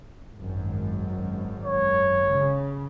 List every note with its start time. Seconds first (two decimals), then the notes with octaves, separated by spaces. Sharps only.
0.36 G#1 F#2
1.63 C#5
2.33 C#3